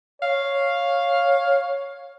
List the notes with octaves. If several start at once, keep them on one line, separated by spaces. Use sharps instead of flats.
C#5 F5